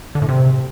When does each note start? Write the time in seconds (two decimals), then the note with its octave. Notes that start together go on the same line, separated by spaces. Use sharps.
0.15 D3
0.22 A2
0.29 C3